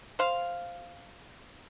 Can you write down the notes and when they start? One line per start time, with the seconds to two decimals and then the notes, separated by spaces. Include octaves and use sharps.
0.19 C5 F5